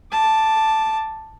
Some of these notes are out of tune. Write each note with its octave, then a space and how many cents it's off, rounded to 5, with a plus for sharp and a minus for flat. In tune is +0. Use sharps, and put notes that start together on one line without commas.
A5 +0 D6 +10